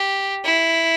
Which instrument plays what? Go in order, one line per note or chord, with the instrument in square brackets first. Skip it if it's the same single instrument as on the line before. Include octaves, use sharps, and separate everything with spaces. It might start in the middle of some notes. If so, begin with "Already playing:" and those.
Already playing: [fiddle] G4
E4